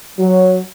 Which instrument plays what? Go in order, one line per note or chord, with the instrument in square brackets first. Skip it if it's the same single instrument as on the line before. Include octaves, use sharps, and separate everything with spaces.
[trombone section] F#3